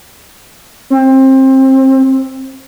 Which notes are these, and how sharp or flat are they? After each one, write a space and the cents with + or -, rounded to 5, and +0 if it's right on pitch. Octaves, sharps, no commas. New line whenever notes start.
C4 +25